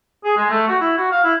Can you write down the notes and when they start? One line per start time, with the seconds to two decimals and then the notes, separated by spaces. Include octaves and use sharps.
0.24 G#4
0.37 G#3
0.50 A3
0.68 F#4
0.81 E4
0.97 F#4
1.11 F5
1.24 E4